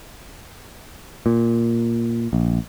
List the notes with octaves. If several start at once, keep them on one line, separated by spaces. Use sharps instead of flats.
A#2
A#1